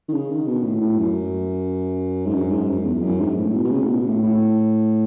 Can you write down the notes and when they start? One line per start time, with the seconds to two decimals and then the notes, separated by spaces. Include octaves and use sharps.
0.08 D#3
0.13 C#3
0.30 D#3
0.47 B2
0.64 A2
0.81 A2
0.98 F#2
2.26 G#2
2.35 F#2
2.52 G#2
2.69 F#2
2.85 E2
3.03 F#2
3.20 G#2
3.37 A2
3.54 B2
3.64 B2
3.71 C#3
3.82 A2
3.88 B2
4.05 A2
4.22 A2